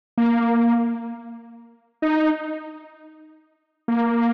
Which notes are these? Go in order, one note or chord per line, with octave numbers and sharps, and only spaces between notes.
A#3
D#4
A#3